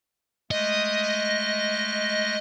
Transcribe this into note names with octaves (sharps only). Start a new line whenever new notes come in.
G#3 A3 D#5